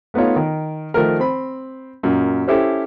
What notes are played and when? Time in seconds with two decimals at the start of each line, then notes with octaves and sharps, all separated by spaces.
0.14 A3 B3 D#4 F4 C#5
0.36 D#3
0.94 D#3 F3 A3 A#4
1.19 C4 B5
2.03 F#2 A#2
2.48 C#4 E4 G4 A4 C5